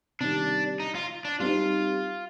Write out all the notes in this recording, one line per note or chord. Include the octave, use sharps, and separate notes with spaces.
C3 D#3 G3 D4
D#4
F4
D4
G3 C4 D#4 F4